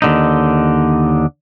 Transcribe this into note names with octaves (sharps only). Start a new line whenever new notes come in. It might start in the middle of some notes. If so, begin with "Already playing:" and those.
D#2 D3 D#4